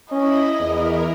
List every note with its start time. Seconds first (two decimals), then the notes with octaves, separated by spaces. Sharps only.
0.12 C#4 E4 D#5 B5
0.60 E2 E3 E4 A#4